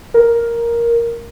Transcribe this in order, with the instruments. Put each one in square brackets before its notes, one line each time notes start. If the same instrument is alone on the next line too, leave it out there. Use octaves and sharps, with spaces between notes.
[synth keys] A#4